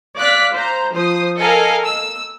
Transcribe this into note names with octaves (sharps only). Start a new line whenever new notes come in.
D5 F5 F#6 B6
C5 A#5
F3 C5 D#6
A4 A#4 D#5 F5 G#5
E6